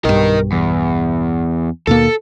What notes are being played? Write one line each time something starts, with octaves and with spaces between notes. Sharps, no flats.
B1 G2 A#4 D#5
E2
D#2 B2 A#3 A4